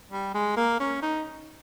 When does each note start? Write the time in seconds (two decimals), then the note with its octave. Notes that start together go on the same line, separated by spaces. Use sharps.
0.11 G3
0.34 G#3
0.56 A#3
0.80 C#4
1.02 D#4